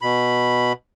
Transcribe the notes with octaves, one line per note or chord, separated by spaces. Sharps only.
B2 B5